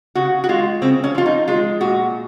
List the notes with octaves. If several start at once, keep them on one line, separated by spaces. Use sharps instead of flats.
C#3 F#4
F#4
G#3 F4
C#3 C4
C#4
F3 F4
D#4
G#3 F4
A#2 F#4